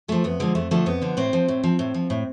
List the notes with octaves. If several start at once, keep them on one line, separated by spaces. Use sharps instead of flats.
D3 F3 A3
F2 B3
D3 F3 G#3
F2 A3
D3 F3 A3
F2 B3
D3 F3
A2 C4
F3
A2
F3
A2
F3
A2